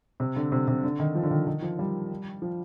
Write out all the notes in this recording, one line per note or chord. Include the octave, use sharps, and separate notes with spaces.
C3
D3
C3
C3
D3
D#3
F3
D3
D#3
D#3
F3
G3
F3